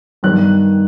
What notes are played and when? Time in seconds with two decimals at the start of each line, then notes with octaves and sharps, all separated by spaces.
0.23 G2 D#3 G3 B3 F#6